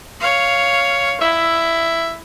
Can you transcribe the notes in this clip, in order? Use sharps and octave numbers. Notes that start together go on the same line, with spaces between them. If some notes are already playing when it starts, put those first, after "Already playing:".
C#5 F5
E4 E5